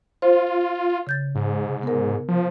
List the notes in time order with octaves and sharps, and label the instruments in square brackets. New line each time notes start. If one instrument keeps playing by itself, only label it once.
[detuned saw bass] F4 [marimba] C5
[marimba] C#3 G6 A6
[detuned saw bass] G#2
[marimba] C3
B3 A#4
[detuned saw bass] F3